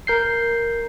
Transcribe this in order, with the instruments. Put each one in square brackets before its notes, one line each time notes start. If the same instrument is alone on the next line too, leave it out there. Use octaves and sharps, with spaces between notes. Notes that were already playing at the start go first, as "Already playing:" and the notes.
[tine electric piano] A#4 G6 C7